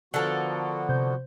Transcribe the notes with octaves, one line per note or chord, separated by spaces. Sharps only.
D3 F3 B3 F#4 A4 A#4
C3 C5 G6